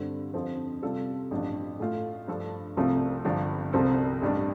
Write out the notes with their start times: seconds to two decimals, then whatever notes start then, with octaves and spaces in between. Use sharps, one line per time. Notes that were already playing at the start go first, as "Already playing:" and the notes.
Already playing: G2 D3 G3 C4 A4
0.34 F2 D3 F3 C4
0.82 C3 G3 F4 A4
1.31 A1 G2 F3 D4
1.80 A2 A3 F4 A4
2.27 G2 F3 D4 A4
2.77 C2 C3 F3 A3 F4
3.25 G1 G2 F3 D4
3.73 C2 C3 F3 C4 A4
4.22 A1 G2 G3 D4